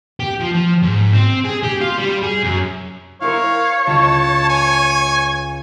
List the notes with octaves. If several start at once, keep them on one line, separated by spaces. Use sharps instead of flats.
G4
F3
F3
G#2
C4
G#4
G4
F4
G3
G#4
F#2
E4 A#4 C5 C#5 F5
C#2 A5 C#6
G#5